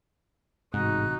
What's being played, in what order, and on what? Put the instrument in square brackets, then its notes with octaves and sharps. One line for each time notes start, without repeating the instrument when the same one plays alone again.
[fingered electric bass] A1 C3 [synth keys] G#2 [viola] D#4 F#4 [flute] F#6